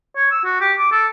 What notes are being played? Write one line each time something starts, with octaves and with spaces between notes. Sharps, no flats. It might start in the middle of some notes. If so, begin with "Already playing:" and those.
C#5
E6
F#4
G4
D6
A4